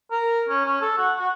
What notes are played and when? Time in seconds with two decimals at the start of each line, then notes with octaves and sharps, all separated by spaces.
0.11 A#4
0.49 C#4
0.65 C#4
0.81 A4
0.98 F#4
1.19 F#4